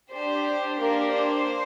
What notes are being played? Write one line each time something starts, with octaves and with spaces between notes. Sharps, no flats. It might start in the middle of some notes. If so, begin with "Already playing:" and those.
D4 G4 C5
A#3 D4 G4 A#4
C5